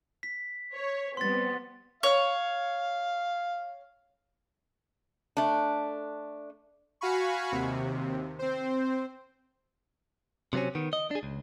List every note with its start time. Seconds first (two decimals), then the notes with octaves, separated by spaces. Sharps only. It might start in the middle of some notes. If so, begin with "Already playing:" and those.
0.23 B6
0.74 C#5
1.17 G3 B3 C4 C6 A6
2.03 C#5 F5
5.37 A3 D4
7.01 F#4 F5 G#5 B5 C#6
7.52 D#2 C3
8.39 C4 C5
10.53 C3 F#3 A3 C4 C#4
10.75 D#3 B3
10.93 D#5
11.11 D4 G#4
11.23 C#2